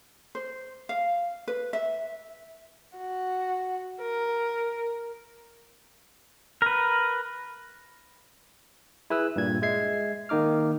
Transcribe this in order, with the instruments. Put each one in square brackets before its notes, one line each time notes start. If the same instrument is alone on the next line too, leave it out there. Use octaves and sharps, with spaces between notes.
[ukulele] C5
F5
B4
E5
[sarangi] F#4
A#4
[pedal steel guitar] A#4 B4
[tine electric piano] E4 G#4 B4 E6
G2 A#2 G#6
G#3 E5 G#6 C7
D#3 A#3 D#4 D6 F6